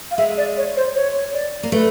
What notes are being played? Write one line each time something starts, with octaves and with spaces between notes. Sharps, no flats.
F5
G#3 E5
D5
C#5
C5
C#5
D5
A#3
A3 B4